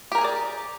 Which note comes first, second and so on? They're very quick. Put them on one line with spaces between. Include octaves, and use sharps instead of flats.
G4 A#4 G#5 G#4 D5